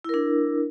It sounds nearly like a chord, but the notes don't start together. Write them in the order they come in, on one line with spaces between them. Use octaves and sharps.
E4 A#4 D4